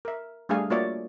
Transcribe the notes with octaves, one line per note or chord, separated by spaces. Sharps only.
A#4 E5
G3 A3 D4 G#4 F5 G#5
A#3 F4 F#4 C#5 D5 E5